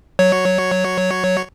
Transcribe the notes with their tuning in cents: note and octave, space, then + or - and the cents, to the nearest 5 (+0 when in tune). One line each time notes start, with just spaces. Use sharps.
F#3 +0 C#5 +0